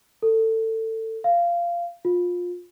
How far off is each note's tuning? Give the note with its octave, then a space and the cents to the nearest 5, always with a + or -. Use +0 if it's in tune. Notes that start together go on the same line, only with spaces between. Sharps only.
A4 +25
F5 -15
F4 +25